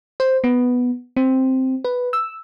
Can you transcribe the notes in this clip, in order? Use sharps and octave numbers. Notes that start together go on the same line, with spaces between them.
C5
B3
C4
B4
E6